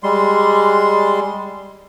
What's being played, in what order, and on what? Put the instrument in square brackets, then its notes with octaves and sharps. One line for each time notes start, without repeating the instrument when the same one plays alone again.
[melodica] G3 G#3 C6